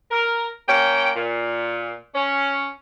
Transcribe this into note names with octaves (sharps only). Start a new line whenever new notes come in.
A#4
A#3 C#4 G5
A#2
C#4